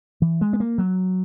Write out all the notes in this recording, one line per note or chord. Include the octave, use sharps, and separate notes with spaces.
E3
G#3
B3
A#3
F#3